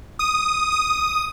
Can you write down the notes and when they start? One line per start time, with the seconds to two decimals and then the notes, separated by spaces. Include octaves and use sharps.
0.19 D#6
0.72 D#6